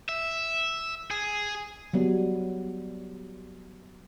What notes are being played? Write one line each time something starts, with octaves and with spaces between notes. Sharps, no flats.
E5
G#4
F#3 G3 B3